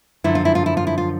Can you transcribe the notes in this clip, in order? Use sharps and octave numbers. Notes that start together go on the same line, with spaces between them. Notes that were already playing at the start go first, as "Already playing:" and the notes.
F#2 D3 F3 E4
F4
E4
F4
E4
F4
E4
F4